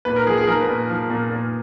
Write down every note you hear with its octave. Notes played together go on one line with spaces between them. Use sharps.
A#2 B4
A#4
F3 G#4
G#4
F3 A#4
B4
A#2
F3
A#2
A#2